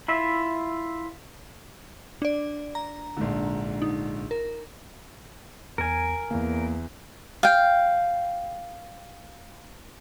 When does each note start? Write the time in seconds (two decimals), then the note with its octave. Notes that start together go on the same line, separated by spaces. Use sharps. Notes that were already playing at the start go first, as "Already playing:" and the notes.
0.08 E4 F4 E5
2.22 D4 D5
2.75 A#5
3.17 A#1 G#2 D3
3.82 D#4
4.31 A#4
5.78 E2 A#4 G#5
6.31 E2 A#3
7.43 F5 G5